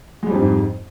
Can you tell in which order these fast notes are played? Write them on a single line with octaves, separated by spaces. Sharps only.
G#3 G3 F2 G#2